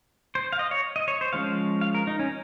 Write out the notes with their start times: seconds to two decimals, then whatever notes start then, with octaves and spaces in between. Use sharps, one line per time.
0.35 C5
0.53 F5
0.59 D#5
0.71 C#5
0.96 D#5
1.08 C#5
1.21 C5
1.33 F3 G#3 C#4 F5
1.81 F5
1.95 A#4
2.07 D#4
2.19 C#4